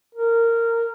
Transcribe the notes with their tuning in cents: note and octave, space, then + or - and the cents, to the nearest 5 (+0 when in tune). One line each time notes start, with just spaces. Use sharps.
A#4 -15